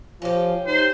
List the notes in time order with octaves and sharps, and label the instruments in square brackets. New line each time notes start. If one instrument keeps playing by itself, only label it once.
[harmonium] F3 F4 [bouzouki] C#4 G4
[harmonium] D#4 [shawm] C5